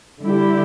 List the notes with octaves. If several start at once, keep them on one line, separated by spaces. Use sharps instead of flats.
D3 G3 E4 G4